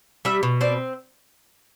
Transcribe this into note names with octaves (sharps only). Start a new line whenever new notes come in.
G3 E5
B2
C4 D5